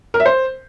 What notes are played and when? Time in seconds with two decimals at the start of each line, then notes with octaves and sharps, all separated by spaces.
0.14 A#4
0.20 E5
0.26 C5